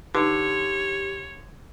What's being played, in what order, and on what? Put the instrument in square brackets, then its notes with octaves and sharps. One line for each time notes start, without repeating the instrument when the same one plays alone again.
[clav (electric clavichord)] D3 [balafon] D#4 B4 [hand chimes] G4 [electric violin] C#5